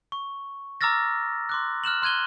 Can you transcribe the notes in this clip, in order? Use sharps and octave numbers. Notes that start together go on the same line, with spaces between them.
C#6
A#5 D6 E6 F6 A6 A#6
C6 D6 F#6
F6 F#6 E7 F#7
C6 F#6 G#6 D#7 G7